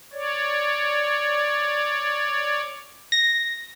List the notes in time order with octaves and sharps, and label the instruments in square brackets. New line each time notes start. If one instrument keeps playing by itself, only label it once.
[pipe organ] C#5 D5
[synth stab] A#6